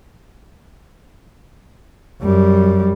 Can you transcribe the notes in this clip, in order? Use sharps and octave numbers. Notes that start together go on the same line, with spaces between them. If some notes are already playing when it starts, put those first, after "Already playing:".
F#2 G3